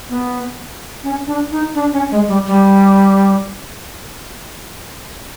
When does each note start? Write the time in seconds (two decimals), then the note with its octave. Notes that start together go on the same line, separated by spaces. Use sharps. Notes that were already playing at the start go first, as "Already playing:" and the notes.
0.09 B3
1.04 C#4
1.27 D4
1.52 D#4
1.75 D4
1.93 C#4
2.11 G#3
2.28 G3
2.47 G3